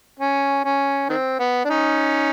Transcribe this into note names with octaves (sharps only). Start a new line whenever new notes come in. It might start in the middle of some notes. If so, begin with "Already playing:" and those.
C#4
C#4
D#3 C4
B3
D4
C#4 D#4